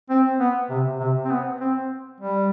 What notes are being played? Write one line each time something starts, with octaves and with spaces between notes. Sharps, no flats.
C4
B3
C3
C3
C4
B3
C4
G3